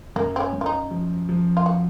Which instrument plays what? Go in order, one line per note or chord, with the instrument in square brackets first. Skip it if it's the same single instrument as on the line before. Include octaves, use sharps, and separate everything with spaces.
[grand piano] F#2 [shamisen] A#3
[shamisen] C4
C#4
[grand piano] F#2
[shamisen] F4
D#4
[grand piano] F3
F3
[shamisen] F4
F#4